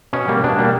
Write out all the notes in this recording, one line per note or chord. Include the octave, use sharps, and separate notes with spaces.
B2 C#4
G3 A#3
B2 D4
G3 A#3